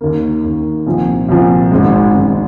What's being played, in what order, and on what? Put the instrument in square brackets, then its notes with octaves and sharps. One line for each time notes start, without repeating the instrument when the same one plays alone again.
[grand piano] D#2 D#3 A#3
D#2 D#3 A#3
C2 A#2 F3
C2 A#2 F3
G#1 G#2 G#3
G#1 G#2 G#3